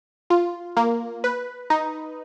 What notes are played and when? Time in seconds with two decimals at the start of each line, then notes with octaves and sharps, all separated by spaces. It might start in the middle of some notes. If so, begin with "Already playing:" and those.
0.30 F4
0.77 A#3
1.24 B4
1.70 D#4